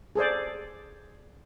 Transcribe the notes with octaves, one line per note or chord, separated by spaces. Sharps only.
G#4 A4 C5 D5